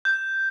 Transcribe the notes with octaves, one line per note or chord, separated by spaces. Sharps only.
G6